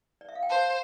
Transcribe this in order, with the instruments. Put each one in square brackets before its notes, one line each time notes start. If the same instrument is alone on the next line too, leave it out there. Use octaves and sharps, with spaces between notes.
[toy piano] D5
E5
F5
G5
[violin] C5 [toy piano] F5 A5